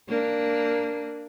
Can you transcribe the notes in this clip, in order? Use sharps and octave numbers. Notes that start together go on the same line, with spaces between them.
A#3 D4